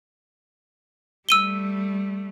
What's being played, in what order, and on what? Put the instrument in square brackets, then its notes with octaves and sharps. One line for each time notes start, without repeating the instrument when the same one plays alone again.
[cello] G3 A3 [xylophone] E6 D#7 G7